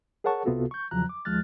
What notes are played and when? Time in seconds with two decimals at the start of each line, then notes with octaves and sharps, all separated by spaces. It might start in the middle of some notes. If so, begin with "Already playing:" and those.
0.24 G#4 A#4 C#5 F#5 A5 C#6
0.45 C2 C3 B3 F4 F#4 A4
0.71 C#6 G6
0.91 E2 C#3 F3 F#3 A#5 F#6
1.09 D6
1.25 D#2 F3 G#3 F6 F#6 A6